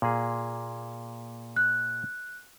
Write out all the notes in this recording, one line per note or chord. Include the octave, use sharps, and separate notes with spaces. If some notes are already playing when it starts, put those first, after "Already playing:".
A#2 A#3 G#4
F#6